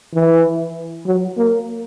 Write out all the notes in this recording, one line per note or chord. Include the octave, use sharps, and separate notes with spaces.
E3
F#3
A#3